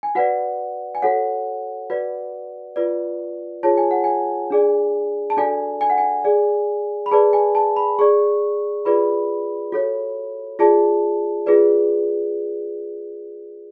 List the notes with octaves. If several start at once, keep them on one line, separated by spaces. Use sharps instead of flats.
G#5
F#4 B4 D5 F#5
G#5
F#4 A4 C#5 F#5
F#4 B4 D5
F4 B4 D5
F4 G#4 C#5 A5
G#5
F#5
G#5
D4 G#4 D5
A5
D4 F#4 A4 D5 G#5
G#5
F#5
G#5
G#4 D5
B5
G#4 B4 D5 A5
G#5
A5
B5
G#4 D5 C#6
F4 G#4 B4 D5 B5
F#4 A4 C#5
F4 G#4 D5 A5
F4 G#4 B4 D5